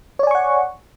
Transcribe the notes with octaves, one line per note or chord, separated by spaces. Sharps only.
C#5 D5 F#5 G#5 C#6